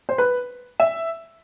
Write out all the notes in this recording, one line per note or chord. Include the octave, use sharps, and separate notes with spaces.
C5
B4
E5